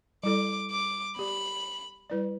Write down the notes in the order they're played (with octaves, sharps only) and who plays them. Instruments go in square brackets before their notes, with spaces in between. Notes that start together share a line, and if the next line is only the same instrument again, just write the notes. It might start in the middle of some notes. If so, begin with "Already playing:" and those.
[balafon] G3 E4 A4 D5 [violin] D6
[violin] D6
[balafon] B3 G4 D5 [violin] B5
[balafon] G3 E4 B4 D5